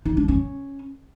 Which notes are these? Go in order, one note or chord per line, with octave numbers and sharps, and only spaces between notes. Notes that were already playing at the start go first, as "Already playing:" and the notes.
D#4
D4
C#4